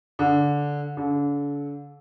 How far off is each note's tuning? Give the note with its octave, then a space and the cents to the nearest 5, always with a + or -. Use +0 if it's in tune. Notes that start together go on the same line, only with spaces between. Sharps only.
D3 -15
D3 -40